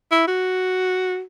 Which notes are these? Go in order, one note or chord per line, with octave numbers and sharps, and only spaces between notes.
E4
F#4